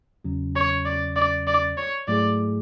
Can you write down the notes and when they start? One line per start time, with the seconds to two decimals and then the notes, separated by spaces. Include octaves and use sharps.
0.24 E2 C#3 F#3 C#4
0.56 C#5
0.86 D5
1.16 D5
1.47 D5
1.78 C#5
2.08 G#2 F#3 A3 E4 G#4 D5